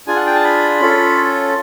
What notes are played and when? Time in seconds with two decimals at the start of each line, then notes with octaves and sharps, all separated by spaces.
0.07 D4 F4 G#4 G#5
0.16 F#5
0.26 G5
0.35 A5
0.44 B5
0.80 C#4 F4 A4